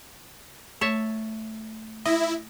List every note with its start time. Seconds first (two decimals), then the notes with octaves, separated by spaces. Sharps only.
0.81 A3 C#5 E5 A5
2.05 E4 D#5